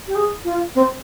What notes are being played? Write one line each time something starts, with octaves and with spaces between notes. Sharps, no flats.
G4
G#4
F4
C4